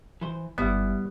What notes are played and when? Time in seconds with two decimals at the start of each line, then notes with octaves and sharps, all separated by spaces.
0.21 E3 C5
0.58 G1 G#2 G3 B3 E4